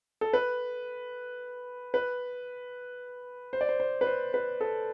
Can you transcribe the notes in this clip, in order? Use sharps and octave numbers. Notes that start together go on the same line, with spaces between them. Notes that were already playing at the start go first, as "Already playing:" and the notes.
A4
B4
B4
C5
D5
C5
C5
B4
C5
B4
A4